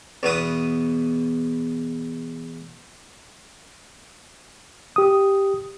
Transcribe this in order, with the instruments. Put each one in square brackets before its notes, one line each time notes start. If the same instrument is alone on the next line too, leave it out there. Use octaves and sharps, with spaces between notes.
[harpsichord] E2 B2 B4 D#6
[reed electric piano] G4 D#6